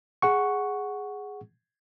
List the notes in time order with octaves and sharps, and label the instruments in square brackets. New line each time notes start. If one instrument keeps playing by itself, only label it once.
[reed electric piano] G#4 F#5 C#6